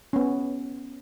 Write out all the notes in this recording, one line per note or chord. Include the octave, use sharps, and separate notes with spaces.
B3 C#4